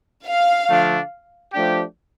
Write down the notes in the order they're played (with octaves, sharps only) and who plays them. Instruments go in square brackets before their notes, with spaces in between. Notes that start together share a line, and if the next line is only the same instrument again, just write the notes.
[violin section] F5
[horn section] D3 F3 A3 D4
F3 A3 D4 G4